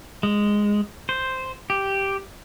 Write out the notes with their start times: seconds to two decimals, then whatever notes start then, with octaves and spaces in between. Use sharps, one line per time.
0.23 G#3
1.09 C5
1.70 G4